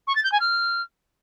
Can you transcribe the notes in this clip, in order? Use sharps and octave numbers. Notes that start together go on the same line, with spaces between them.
C#6
A6
G6
G#5
F6